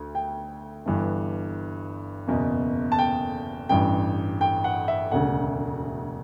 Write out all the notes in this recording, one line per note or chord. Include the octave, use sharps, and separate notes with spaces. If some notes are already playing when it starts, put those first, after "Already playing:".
Already playing: D2 D3
G5
G1 G2 E3
F#1 E2 B2
A5
G5
A1 G2 E3 G5
G5
F#5
E5
E1 D2 C#3 F#5